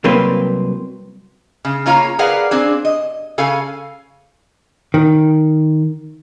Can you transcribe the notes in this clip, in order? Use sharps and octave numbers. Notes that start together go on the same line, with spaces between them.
C2 F#3 A#3 C4 B4 C5
C#3
C#3 A#3 F4 C#5 F5 A#5
G#4 A#4 B4 D5 F5 F#5
C4 D4 G#4
D#5
C#3 A4 F5 G#5
D#3